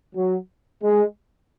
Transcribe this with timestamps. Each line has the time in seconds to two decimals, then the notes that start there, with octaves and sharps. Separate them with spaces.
0.16 F#3
0.83 G#3